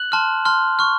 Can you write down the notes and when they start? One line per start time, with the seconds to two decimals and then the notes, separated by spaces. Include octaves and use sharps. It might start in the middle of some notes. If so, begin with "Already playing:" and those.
Already playing: F#6 F#7
0.12 A5 C6 F6
0.45 A5 C6 F6
0.79 C#6 F6